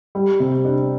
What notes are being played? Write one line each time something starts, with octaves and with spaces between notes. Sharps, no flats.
G3
C3
D4